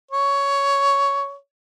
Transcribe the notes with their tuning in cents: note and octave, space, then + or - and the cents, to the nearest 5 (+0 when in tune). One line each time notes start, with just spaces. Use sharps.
C#5 +10